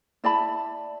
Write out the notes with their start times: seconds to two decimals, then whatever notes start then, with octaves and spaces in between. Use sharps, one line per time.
0.24 E4 D5 A5 B5